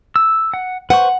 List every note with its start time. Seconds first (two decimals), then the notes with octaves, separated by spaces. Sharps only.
0.16 E6
0.54 F#5
0.90 B4 C5 F#5 C#6